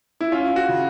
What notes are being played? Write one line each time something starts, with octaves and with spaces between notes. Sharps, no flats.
E4
C#4 F4
F#4
C#3